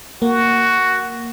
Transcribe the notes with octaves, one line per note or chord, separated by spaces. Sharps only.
A#3 F#4